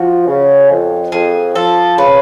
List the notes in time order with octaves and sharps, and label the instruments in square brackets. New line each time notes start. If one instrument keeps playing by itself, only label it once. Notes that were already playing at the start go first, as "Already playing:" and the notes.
Already playing: [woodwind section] F3 [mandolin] F#4
[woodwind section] C#3
F2
[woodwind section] F2 [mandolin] G#4
[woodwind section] F3 [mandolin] A4
[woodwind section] C#3 [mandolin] B4